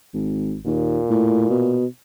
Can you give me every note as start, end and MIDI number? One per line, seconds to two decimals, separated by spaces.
0.13 0.57 32
0.66 1.00 39
0.66 1.84 46
1.10 1.50 45
1.50 1.86 47